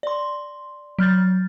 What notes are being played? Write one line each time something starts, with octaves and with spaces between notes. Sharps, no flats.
D5 C6
F#3 F6 G6 A6